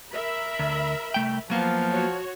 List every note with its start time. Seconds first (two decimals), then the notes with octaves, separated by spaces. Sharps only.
0.11 A#4 E5 B5
0.59 D2
1.14 C2 A3 G5
1.50 F3 F#3 A#3 B3 F5
1.90 F#4 C#5